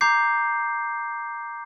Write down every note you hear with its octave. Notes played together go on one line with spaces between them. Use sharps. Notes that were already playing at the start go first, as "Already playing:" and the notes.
A#5 D6 G6 C7